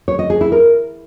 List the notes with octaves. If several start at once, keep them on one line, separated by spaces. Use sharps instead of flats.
C#5
D#5
G#4
E4
A#4